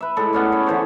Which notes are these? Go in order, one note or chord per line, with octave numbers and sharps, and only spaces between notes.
B4 E5
A2 G#3 A4
B3 C#4 D4
C#5
D3 E3 C5 C#5